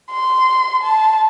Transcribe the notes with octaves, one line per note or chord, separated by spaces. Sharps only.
C6
A5